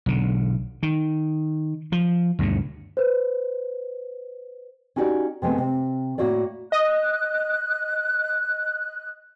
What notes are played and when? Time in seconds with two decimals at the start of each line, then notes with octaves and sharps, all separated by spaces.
0.06 B1 D3
0.83 D#3
1.92 F3
2.39 D2 G2 B2 D3
2.97 B4 C5
4.96 C#4 D#4 F#4 G4 D5
5.42 C3 G#3 A3 B3
5.58 C3
6.18 A2 A#3 F#4 C#5 D5
6.72 D#5 F#6